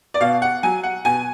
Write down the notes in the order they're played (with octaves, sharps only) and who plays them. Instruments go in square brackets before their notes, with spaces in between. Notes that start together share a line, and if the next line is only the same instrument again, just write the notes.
[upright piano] D5
B2 F5
F#5
F#3 G#5
F#5
B2 G#5